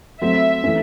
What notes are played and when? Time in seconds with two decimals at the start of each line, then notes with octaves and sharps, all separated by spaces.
0.22 F#3 A3 C4 E5
0.63 E3 A3 C#4